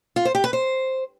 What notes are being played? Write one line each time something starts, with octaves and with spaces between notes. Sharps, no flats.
F4
C5
G4
B4
C5